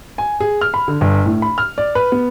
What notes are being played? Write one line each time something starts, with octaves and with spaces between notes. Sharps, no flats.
G#5
G#4
F6
B5
D3
G1
A2
B5
F6
D5
B4
B3